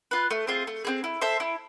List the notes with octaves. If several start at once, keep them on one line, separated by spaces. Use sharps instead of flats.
F4 B4
A3
C4 F4 G#4
A3
C4 F4 G#4
E4
A4 C5 E5
E4